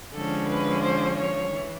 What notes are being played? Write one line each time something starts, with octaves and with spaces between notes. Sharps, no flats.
D3 F3 G#3 C#4 A4
B4
C5
C#5
E3